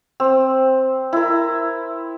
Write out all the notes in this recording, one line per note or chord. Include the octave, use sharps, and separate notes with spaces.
C4
E4 A#4